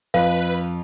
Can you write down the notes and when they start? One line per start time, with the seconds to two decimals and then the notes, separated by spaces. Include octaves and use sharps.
0.14 F2 B4 F5